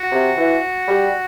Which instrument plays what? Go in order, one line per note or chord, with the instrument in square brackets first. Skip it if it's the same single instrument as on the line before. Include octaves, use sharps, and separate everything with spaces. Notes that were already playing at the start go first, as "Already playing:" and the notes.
Already playing: [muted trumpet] F#4
[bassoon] C3
E3
G3